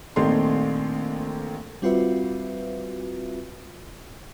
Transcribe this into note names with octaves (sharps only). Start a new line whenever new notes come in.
A#1 D#3 A3 C4 C6
G3 C4 F4 F#4 B4 E5